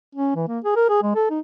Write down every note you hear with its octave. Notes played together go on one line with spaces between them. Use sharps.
C#4
E3
A#3
G#4
A#4
G#4
G#3
A4
D#4